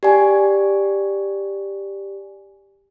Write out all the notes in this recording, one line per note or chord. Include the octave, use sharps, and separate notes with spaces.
G4 D5 G#5